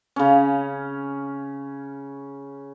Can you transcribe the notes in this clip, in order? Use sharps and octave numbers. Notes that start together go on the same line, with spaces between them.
C#3 C#4